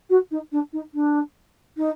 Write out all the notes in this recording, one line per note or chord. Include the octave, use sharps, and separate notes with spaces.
F#4
D#4
D4
D#4
D4
D#4